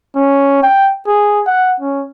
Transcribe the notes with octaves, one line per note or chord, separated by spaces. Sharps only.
C#4
G5
G#4
F#5
C#4